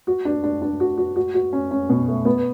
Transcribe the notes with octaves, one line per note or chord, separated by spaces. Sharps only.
F#4
D4
D4
D4
F#4
F#4
F#4
F#4
C#4
C#4
B2
A3
B3